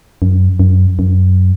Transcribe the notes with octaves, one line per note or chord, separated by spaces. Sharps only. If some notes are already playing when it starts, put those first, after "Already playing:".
F#2
F#2
F#2